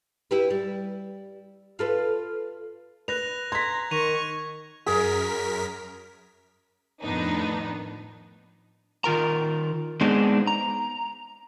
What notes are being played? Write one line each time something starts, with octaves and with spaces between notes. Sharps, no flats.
E4 G4 B4
G3
F4 A4 B4
B4 F#6 A#6 F7
A#5 C6 G#6 B6
D#3 C#6 A#6 D#7 F7
F#2 G#4 A#4 B6
F2 A2 D#3 B3 D4 D#4
D#3 F4 A#4 A#5
G#3 B3 C4 D4 D#4 G#4
A#5